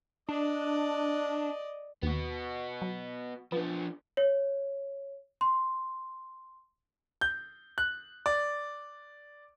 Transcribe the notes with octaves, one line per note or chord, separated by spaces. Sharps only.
D4 D5 D#5
D#2 B3 F#4
F#3
F3 B3 D4
C#5
C6
G6
F#6
D5